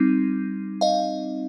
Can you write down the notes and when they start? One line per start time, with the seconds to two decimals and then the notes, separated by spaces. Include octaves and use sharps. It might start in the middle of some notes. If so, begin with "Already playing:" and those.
Already playing: G3 C4 D#4
0.81 D#5 F5